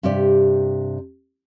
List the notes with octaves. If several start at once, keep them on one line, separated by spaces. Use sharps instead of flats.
G2 C3 G4 D5